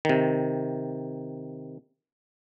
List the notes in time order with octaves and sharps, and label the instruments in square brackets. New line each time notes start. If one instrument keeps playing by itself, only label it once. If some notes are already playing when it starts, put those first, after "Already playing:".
[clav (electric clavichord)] C3 D#3